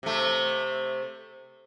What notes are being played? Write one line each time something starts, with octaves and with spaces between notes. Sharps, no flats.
C3 A3